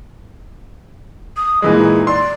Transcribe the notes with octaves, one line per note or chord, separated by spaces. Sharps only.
D#6
A#2 E3 G#3 D#5
D#4
D5 C6